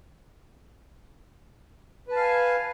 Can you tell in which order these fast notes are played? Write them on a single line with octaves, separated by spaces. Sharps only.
B4 A5 F5 G#5